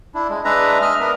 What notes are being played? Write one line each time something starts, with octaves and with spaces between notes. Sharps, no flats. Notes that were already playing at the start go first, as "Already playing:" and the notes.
D4 E4
G#3
G#3 D4 B4 E5 A#5
D#5 E5 F6
B3 D4 A#4